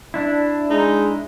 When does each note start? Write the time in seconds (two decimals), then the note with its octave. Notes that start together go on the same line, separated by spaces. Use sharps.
0.14 D4 E4
0.70 G#3 D#4